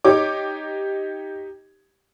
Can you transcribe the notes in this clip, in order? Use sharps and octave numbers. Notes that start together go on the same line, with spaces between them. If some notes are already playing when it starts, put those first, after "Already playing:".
D#4 G4 C#5 D6